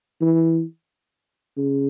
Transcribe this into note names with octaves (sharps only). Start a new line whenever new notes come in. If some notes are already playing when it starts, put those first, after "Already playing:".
E3
C#3